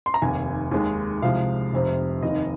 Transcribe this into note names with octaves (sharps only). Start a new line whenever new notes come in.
C6
A#5
F1 D#2 D#3 G#5
D#2 D#3 G#3
C2 C3 F3 G#3 F5
F1 F2 C3
F1 D#2 D#3 D#5